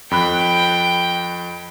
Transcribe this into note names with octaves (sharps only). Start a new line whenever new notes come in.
F2 G5 B5 F#6